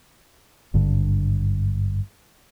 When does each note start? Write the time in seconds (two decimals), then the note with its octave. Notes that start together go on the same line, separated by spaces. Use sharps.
0.74 G#1 G2 D3